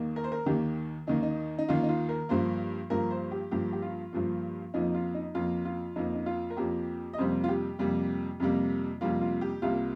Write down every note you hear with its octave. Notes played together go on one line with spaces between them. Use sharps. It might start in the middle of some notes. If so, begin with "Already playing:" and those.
Already playing: D#2 D#3 A#3
A#4
C5
A#4
D#2 D#3 A#3 G4
D#2 D#3 A#3 D#4
D#4
D#4
D#2 D#3 A#3 F4
D#4
F4
A#4
G2 F3 A#3 C5
G2 F3 A#3 A#4
C5
G4
G2 F3 A#3 G4
G4
F4
G2 F3 A#3
F2 F3 A#3 D#4
F4
D#4
F2 F3 A#3 F4
F4
F2 F3 A#3 D#4
D#4
F4
A#4
F2 F3 A#3 G4
D#5
F2 C3 G3 A#3 C5
F4
G4
F2 C3 G3 A#3
F2 C3 G3 A#3
F2 C3 G3 A#3 F4
F4
G4
C2 C3 G3 A#3 F4